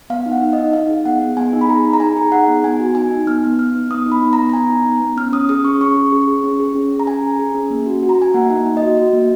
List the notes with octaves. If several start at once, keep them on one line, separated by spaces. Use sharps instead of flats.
B3 F5
D#4
F#5
D#4
D#4 D#5
D#4 F5
G#4
B3 F#5
G#4
B3 G#5
D#4
B5
G#4 A#5
D#4
A#5
D#4 G#5
G#4
D#4 F#5
B3
B3 G#5
F#4
D#4 G#5
D#4
B3 F6
B3
B3 F6
D#4
B3 D#6
D#4
B5
B3
A#5
B3
A#5
B3 G#5
D#4
B3
B3
C#4 F6
C#4 D#6
G#4 D#6
C#4 C#6
C#4 C#6
G#4
G#4
G#4
C#4
G#4
C#4
C#4
A#5
G#4 G#5
G#4
G#4
C#4
A#3
F#4
F#4
A#5
F#4 G#5
A#3 F#5
D#4
A#3
D#5
F#4
F#4
A#3